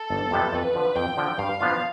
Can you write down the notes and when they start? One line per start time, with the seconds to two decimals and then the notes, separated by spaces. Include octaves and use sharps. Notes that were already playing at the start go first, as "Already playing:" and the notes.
Already playing: A4
0.10 G1
0.31 F2 C3 G3 B3
0.53 F2 B4
0.75 D3 F3
0.95 F2 G5
1.17 D3 F3
1.38 G2 F5
1.61 F3 B3 D4 F4